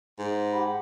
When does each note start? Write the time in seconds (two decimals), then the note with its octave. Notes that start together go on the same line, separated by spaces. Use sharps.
0.19 G#2
0.52 G4 F#5 B5